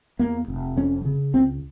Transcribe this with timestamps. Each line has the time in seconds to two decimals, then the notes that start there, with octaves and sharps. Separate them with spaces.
0.19 E2 A#3
0.48 F1
0.77 F2 C#4
1.05 C#3
1.34 C#2 C4